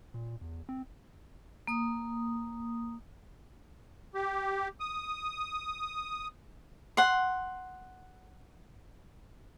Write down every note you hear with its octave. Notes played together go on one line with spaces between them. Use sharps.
A#2
E2
C4
A#3 D#6
G4
D#6
F#5 C6